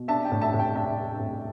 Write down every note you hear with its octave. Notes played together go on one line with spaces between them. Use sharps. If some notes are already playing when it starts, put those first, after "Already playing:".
Already playing: B2
D4 E5 A5
G5
A2
E5 A5
A2
G5
D4 E5 A5
D4
A2